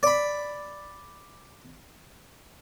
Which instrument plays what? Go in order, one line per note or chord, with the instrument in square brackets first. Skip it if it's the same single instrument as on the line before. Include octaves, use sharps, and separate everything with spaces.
[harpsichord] D5 B5